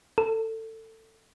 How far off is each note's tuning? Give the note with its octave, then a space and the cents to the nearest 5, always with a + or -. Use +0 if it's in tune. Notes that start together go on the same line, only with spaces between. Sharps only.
A4 +20